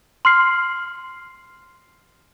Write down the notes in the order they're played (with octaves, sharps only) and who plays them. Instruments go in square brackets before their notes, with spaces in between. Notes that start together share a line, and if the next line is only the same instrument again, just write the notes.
[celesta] C6 F6 C7